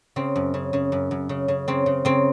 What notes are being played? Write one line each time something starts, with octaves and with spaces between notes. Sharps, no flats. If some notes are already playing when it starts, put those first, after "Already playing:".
C#3 C4
F#2
C#3
C#3
F#2
F#2
C#3
C#3
C#3 C4
C#3
C#3 C4